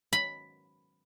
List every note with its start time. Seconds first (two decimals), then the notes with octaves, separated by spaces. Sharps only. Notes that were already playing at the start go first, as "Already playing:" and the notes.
0.13 B5